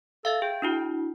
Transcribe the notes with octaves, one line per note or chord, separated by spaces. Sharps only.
A4 E5 F5
G#4 G5
D4 E4 F#4